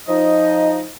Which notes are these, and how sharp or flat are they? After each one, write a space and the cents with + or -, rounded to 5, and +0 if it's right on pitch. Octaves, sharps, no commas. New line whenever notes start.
F3 +10 D#4 +10 D#5 +0